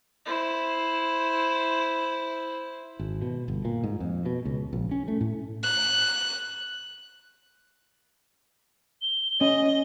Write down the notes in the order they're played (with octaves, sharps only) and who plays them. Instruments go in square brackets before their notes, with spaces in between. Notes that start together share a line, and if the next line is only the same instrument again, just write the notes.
[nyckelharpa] E4 C5
[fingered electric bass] G#1
B2
G1
A#2
G#2
F2
B2
C#2
A#1
C#4
A3
A2
[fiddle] F#6
[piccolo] G7
[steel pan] C#4 [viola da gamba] D#5